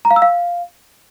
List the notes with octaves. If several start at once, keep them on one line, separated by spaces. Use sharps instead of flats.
A#5
F5
E6
F5